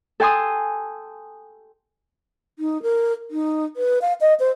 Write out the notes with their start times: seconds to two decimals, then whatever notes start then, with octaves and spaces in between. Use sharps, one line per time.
0.20 A4 G5 G#5 C6 D#6
2.59 D#4
2.82 A#4
3.31 D#4
3.77 B4
4.02 F5
4.21 D#5
4.40 C5